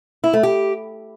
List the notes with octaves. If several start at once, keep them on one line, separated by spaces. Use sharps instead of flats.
E4
A3
G4